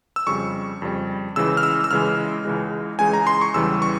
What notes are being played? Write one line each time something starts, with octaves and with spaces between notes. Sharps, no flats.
E6
F2 C#3 G3 C#6
F2 C#3 G3
C#2 C#3 E3 G#3 E6
F6
E6
E6
C#2 C#3 E3 G#3 F6
C#2 C#3 E3 G#3
C#2 C#3 E3 G#3 G#5
A#5
C6
C#6
E2 C#3 E3 G3 E6
C#6